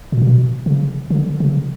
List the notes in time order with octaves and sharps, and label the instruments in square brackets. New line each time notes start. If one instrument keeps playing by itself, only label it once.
[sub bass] A#2
B2
C#3
D3
C#3